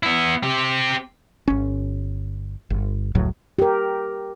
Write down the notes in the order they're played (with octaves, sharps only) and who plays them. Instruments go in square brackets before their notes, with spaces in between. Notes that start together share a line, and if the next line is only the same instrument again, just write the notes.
[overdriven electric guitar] B3 E4
C4 G4
[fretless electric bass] G1 C#4
G1
F1 C#2 A2 F#3
[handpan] G4 A#4